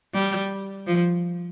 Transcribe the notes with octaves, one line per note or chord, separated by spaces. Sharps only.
G3
F3